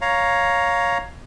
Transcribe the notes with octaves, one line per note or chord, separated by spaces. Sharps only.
C#5 F5 A#5